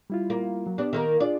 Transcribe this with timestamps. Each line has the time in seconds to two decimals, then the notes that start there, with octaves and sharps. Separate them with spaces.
0.10 G3 E4 F4
0.30 A#3
0.67 F#3
0.78 B3 D4 G4
0.93 D#3 A#3 A#4
1.20 D4 F4 G#4 D5